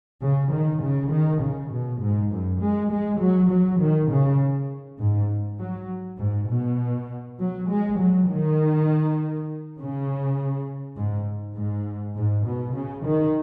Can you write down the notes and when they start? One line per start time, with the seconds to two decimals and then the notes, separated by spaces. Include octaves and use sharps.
0.22 C#3
0.52 D#3
0.82 C#3
1.11 D#3
1.42 C#3
1.71 B2
2.01 G#2
2.31 F#2
2.61 G#3
2.91 G#3
3.20 F#3
3.50 F#3
3.80 D#3
4.10 C#3
4.99 G#2
5.60 F#3
6.19 G#2
6.49 B2
7.39 F#3
7.68 G#3
7.98 F#3
8.28 D#3
9.76 C#3
10.96 G#2
11.56 G#2
12.15 G#2
12.45 B2
12.75 C#3
13.05 D#3